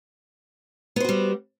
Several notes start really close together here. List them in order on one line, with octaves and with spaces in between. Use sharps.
B3 C5 F#4 G3